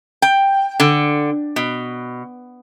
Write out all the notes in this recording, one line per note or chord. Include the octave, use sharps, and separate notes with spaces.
G5
D3
B2